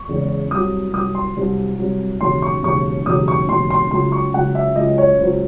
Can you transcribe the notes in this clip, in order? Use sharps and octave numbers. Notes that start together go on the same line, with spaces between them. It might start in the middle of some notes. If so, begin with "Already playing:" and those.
Already playing: C#6
E2 C#3 G#3
C2 C3 F#3 D#6
C2 C3 F#3 D#6
C6
C2 C3 F#3
C2 C3 F#3
E1 D#2 C#3 F#3 C6
C#6
E1 D#2 C#3 F#3 C#6
E1 D#2 C#3 F#3 D#6
C#6
E1 D#2 C#3 F#3 C6
C6
C#2 C#3 F#3 C6
C#6
C#2 C#3 F#3 F#5
E5
C#2 C#3 F#3 D#5
C#5
C#2 C#3 F#3 C5